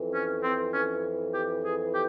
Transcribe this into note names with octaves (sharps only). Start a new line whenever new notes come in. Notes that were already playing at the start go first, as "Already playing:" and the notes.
Already playing: F2 E3
C#4
C4
C#4
G4
G#4
G4